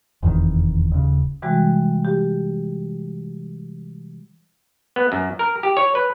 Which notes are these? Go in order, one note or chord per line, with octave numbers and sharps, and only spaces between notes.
F1 E2 C3 D#3
D#1 C#3
C3 E3 G3 G#3 F#4
G4
B3
F#2
A#4
G4
C#5
B4